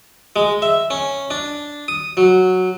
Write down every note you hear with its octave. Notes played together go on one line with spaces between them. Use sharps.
G#3
E5
C#4
D4
D#6
F#3